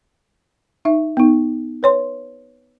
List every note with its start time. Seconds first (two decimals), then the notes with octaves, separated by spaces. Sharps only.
0.85 D#4 E5
1.17 B3 D#4
1.83 B4 C#5 C6